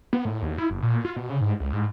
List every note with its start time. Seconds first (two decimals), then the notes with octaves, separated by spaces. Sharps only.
0.13 B3
0.25 A2
0.42 D#2
0.58 E4
0.70 F#1
0.82 A#2
1.05 F4
1.16 B2
1.29 C#3
1.41 G#2
1.60 C#2
1.73 G#2